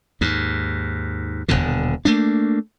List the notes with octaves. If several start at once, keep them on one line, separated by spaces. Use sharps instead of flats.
D#2 G#2
D#1 B1 B2 D3
A3 A#3 D4